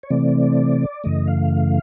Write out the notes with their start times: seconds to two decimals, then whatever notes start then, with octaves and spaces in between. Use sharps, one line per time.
0.03 C#5
0.10 C3 E3 A3 C4 D5
1.04 F#2 C#3 E3 A3 D#5
1.27 F5